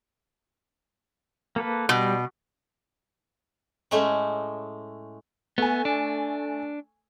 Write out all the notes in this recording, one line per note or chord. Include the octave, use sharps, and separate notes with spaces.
A#3 A4 B4
B2 G3
A2 G#3 A3 C#4
A3 B3 G#5
D4